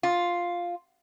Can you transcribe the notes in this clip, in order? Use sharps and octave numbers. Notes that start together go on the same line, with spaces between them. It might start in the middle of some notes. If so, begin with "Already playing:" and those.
F4